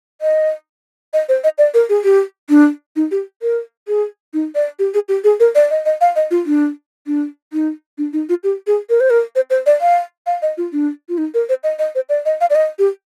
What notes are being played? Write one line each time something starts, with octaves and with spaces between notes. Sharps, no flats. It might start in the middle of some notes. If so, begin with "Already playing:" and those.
D#5
D#5
C5
D#5
D5
A#4
G#4
G4
D4
D#4
G4
A#4
G#4
D#4
D5
G4
G#4
G4
G#4
A#4
D5
D#5
D#5
F5
D#5
F4
D4
D4
D#4
D4
D#4
F4
G4
G#4
A#4
C5
A#4
C5
C5
D5
F5
F5
D#5
F4
D4
F4
D#4
A#4
C5
D#5
D#5
C5
D5
D#5
F5
D5
D#5
G4